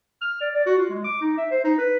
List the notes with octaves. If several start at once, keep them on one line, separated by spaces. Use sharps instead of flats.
F6
D5
D5
F#4
F4
G#3
D6
D#4
E5
C5
D#4
B4